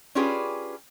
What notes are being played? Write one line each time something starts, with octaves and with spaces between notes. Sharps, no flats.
C#4 D4 F4 G4 G#4 B4